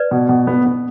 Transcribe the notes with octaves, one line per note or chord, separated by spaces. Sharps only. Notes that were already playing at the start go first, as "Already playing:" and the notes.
Already playing: B4 D5
B2
B2
B3
B3